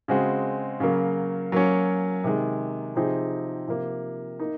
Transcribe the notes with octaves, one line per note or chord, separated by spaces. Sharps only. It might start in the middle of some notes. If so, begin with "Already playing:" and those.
C#3 G#3 C4 F#4
C#3 F#3 A#3
F#3 A#3 C#4
C3 D#3 G#3
C3 F3 C4 D#4 G#4
C3 F3 A#3
A#3 D#4